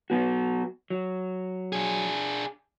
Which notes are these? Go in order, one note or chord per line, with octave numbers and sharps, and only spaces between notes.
F#3 B3 F#4
F#3
D4 G#4